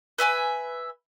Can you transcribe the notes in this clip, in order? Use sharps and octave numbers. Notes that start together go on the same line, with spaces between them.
B4 E5 G#5 B5